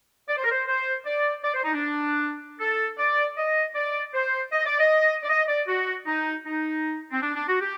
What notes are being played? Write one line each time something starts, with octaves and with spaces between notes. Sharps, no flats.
D5
C5
A#4
C5
C5
D5
D5
C5
D#4
D4
A4
D5
D#5
D5
C5
D#5
D5
D#5
D5
D#5
D5
F#4
D#4
D#4
C4
D4
D4
F#4
G4